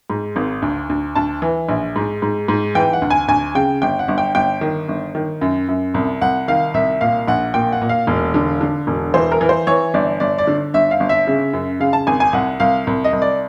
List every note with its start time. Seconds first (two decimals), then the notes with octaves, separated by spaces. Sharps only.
0.10 G#2
0.36 G#1
0.62 D2
0.89 D2
1.15 D2 A5
1.42 E3
1.69 A#1
1.96 G#2
2.22 G#2
2.48 G#2
2.75 E3 G5
2.93 F#5
3.02 D2
3.10 G#5
3.28 D2 G#5
3.55 C#3 G5
3.82 G1 G5
3.99 F#5
4.08 G1
4.18 G5
4.35 G1 G5
4.61 D#3
4.88 G1
5.15 D#3
5.41 F#2
5.69 F#2
5.94 C2
6.21 C2 F#5
6.48 D#3 F5
6.74 C2 E5
7.01 A#2 F5
7.27 A#1 F#5
7.54 A#2 G5
7.72 F#5
7.82 A#2
7.89 F5
8.07 E1
8.34 D3
8.61 D3
8.87 E1
9.14 E3 C5
9.32 A#4
9.41 E3
9.49 C5
9.67 E3 C#5
9.94 G1 D5
10.20 G1 D5
10.38 D5
10.47 D3
10.74 G1 E5
10.91 F5
11.00 G1
11.09 E5
11.27 C#3
11.53 F#2
11.80 C#3 F5
11.93 A5
12.07 G#1 G#5
12.20 G#5
12.33 C2 F#5
12.60 C2 F5
12.87 C2
13.04 D#5
13.13 C2
13.22 D5